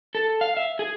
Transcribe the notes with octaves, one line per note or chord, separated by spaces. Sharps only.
A4
F5
E5
G#4